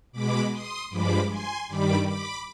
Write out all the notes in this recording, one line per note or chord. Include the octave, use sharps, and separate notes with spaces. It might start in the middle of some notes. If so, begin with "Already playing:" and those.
B2 G#3 B5 D6
C6 D#6
G2 F3 G#3 B5 D6
G#5 C6
G2 D#3 G3 B5 D6
B5 D6